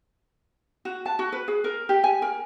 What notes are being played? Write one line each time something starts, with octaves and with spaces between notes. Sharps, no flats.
F#4
A5
F#4
B4
G#4
A#4
G4
G#5
A#4